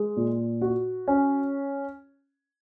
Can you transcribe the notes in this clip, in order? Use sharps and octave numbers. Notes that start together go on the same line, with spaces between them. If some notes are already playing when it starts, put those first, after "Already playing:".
Already playing: G#3
A#2
F#4
C#4